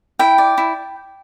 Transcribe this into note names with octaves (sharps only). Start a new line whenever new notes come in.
E4 G5
D5
E4